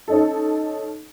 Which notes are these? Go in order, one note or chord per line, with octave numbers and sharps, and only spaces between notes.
C#4 D#4 A4